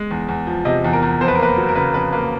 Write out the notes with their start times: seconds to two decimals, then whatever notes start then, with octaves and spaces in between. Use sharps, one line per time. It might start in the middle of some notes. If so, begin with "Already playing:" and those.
Already playing: G#3
0.11 E2
0.29 E2
0.47 F3
0.65 C3 D#5
0.84 E2
0.93 A#4
1.03 E2
1.21 F2 C5
1.28 B4
1.35 A#4
1.39 A#3 B4
1.57 F#3
1.69 A#4
1.75 C#3 B4
1.94 F2 B4
2.12 A#3 B4